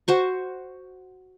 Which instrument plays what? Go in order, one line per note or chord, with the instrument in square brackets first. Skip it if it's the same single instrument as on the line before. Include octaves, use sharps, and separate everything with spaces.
[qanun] F#4 C5 C#6